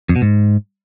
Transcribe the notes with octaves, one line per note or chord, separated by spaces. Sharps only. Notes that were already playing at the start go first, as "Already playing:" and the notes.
F2
B2
G#2